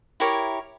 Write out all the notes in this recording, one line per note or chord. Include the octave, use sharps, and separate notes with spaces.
E4 G4 A#4 C#5